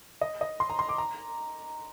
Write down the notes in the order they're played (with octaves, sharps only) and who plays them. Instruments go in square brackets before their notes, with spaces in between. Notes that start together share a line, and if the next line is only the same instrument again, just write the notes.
[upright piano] D#5
D#5
C6
A#5
C6
D6
A#5